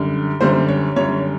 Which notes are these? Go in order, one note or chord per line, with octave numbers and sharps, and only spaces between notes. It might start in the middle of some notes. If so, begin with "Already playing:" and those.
Already playing: F#2 D3 G3
F#2 D3 G3 C5
C#5
F#2 D3 G3 C#5